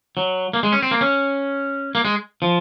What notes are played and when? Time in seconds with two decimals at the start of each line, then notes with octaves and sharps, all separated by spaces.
0.17 F#3
0.53 A#3
0.63 G#3
0.72 C#4
0.82 C4
0.91 A#3
1.01 C#4
1.95 A#3
2.05 G#3
2.42 F3